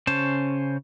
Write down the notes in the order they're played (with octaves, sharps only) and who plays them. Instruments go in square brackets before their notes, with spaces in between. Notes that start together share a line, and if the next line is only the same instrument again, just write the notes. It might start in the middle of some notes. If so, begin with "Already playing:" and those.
[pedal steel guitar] C#3 C#4 C5 A5